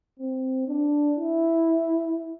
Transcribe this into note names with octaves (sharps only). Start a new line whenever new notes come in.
C4
D4
E4